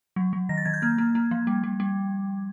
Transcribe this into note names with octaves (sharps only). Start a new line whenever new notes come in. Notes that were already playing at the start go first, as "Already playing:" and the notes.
F#3
F#3
D#3 A#6
A6
D#3 G#6
G6
A#3 G#6
A#3
A#3
F3
G3
G3
G3